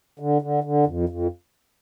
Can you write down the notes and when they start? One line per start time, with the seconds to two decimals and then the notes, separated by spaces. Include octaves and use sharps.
0.19 D3
0.42 D3
0.64 D3
0.87 F2
1.09 F2